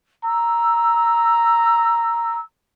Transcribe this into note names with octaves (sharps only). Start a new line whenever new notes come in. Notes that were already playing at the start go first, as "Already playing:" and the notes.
A#5 E6